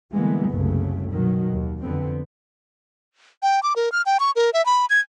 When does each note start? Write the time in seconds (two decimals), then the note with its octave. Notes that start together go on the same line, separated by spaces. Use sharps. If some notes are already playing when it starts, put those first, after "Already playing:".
0.14 D3 E3 G3 G#3 A#3 B3
0.51 F#1 C2 C#3 F#3 A3
1.11 B2 D#3 F#3
1.51 D#2
1.82 F2 D3 B3 C4
3.42 G5
3.63 D6
3.76 A#4
3.92 F6
4.06 G5
4.20 C#6
4.36 A#4
4.54 E5
4.66 B5
4.90 G#6